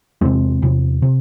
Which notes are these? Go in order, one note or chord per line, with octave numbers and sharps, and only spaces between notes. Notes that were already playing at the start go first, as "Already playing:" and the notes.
E2 C3 G#3 C4
E2 C3
C3